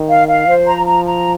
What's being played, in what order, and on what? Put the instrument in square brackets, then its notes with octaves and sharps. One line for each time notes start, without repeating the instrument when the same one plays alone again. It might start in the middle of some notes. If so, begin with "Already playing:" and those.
Already playing: [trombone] D#3
[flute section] F5
F5
[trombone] F3 [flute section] C5
[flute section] A#5
A#5
A#5